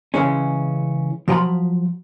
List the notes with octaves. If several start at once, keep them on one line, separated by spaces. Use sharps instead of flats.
C#3 E3 G#3 C#4
F3 F#3 F4 G5 A#5 B5